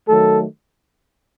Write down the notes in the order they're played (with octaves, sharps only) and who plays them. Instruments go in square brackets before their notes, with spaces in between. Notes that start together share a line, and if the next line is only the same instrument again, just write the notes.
[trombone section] D#3 F#3 A3 A4